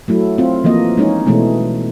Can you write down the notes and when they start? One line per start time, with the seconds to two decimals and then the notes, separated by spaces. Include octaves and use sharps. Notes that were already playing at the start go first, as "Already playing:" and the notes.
0.08 F#3 A3 E4
0.38 C4 F4
0.64 E3 F3 A#3 D#5
0.97 G#3 C#4 D#4
1.26 B2 E3 G#3 A3 C#4